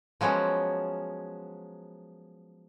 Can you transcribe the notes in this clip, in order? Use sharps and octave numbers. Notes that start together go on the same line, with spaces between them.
F3 F#3 G#3 B3 C#4